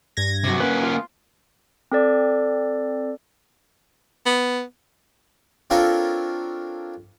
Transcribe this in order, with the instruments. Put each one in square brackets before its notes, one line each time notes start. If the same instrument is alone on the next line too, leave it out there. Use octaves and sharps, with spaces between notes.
[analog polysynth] G2 G#6 A#6
[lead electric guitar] C3 F#3
[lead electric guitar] A#3 C#4 [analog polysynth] B4
[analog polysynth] F4
[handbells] C4 A4 D5
[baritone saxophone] B3
[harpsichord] C4 D4 F4 A4 A#4 C#5